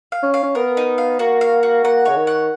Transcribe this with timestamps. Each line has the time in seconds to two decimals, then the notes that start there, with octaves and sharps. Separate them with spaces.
0.12 F5
0.23 C#4
0.34 F5
0.43 C#4
0.55 B3 A#4
0.77 D#4
0.98 F5
1.19 A#3 F#4
1.41 F5
1.63 F#4
1.84 A#3 F#5
2.05 C#3 C#5
2.17 D#3
2.27 F#5